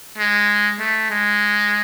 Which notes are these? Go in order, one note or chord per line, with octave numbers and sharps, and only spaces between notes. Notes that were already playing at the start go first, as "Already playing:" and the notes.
G#3
A3
G#3